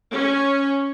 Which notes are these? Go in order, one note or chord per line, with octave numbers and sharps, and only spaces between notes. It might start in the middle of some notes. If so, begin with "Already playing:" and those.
C#4